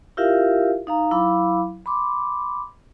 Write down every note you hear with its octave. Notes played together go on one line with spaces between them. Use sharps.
E4 F4 G4 A#4 E5 F5
D#4 F5 A#5
F#3 E4 F5 B5 D6
B5 C6 D6